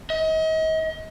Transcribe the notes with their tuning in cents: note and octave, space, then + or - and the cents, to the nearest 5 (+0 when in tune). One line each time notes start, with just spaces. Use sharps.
D#5 +35